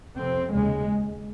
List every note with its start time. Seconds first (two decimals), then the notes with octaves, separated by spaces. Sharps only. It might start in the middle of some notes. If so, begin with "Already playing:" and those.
0.18 F2 C3 C4
0.53 D#2 C#3 G#3